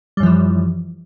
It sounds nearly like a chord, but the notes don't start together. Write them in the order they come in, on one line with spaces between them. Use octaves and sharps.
G3 F#2 F3 E3